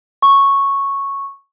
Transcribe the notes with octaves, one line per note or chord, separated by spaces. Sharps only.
C#6